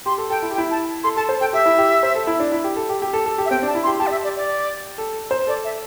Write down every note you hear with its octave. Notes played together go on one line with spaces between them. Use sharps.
G4 C6
A4
A4 G5
E4
G4
G5
E4
A5
A4 C6
A4 A5
C5
A4 G5
G4 E5
E4
G4
C5
A4
E4
D4
E4
G4
A4
G4
G4
A4
A4
G4
E5
C4 G5
D4 A5
E4
C6
G4
G4 A5
D5
E5
D5
D5
A4
C5
A4 D5
E5